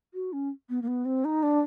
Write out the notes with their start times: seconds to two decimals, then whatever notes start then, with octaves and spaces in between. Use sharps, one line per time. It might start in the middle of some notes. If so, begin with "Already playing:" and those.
0.14 F#4
0.32 C#4
0.69 B3
0.82 A#3
0.87 B3
1.05 C4
1.24 D#4
1.43 D4